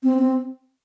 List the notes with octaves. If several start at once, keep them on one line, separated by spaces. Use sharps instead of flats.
C4
C4